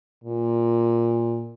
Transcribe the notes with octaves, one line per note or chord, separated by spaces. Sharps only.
A#2